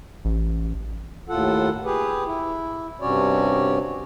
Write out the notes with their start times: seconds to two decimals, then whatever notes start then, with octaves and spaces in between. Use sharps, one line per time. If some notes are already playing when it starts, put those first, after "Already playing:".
0.25 A1
1.29 D#2 A2 F4 A4 F#5
1.85 G4 G#4 B4
2.26 E4
3.01 G2 C3 C#4 F#4 C#5 D5